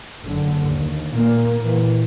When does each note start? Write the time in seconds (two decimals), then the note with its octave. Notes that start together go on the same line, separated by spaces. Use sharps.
0.23 F#1 D3
0.69 D#2
1.12 A#2 A#3
1.62 A#2 E3